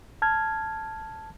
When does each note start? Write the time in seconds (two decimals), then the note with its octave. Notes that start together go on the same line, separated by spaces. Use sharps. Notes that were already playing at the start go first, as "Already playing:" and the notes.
0.22 A5 F6 G#6